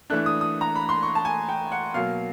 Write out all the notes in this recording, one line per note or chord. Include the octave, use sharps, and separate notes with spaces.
E3 A3 D4 F#6
D#6
D#6
A#5
B5
C6
C#6
A5
G#5
G5
F#5
B2 F#3 A#3 F5